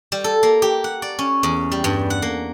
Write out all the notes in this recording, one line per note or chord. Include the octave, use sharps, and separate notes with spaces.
G3
A4
A#3
G4
F#5
D5
C#4
E2
G3
G2
F#5
A#3